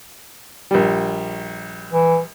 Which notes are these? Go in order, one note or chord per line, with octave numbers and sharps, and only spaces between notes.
A#1 G3
E3